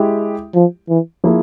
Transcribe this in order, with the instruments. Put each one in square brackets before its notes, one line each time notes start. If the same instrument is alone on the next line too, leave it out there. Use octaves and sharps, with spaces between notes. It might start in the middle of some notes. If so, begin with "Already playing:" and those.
Already playing: [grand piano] G#3 E4 G4
[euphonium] F3
E3
[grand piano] F3 A#3 E4 G#4